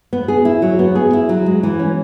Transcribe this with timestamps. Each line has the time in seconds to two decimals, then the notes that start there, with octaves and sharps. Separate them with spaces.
0.13 B3
0.28 G#4
0.45 E4
0.62 F#3
0.79 B3
0.95 G#4
1.13 E4
1.29 F#3
1.46 G#3
1.63 E3
1.79 C#4